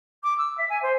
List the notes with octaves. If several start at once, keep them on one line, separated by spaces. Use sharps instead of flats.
D6
E6
E5
G#5
C5